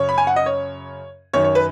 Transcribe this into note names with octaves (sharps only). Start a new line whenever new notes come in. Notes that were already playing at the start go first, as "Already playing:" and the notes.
Already playing: F#2 C#3 C#5
B5
G#5
F#5
D#5
C#5
F#2 D#3 C#5
C#5
B4